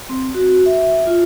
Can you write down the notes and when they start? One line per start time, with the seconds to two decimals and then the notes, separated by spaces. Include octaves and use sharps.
0.09 C4
0.34 F#4
0.66 E5
1.07 F4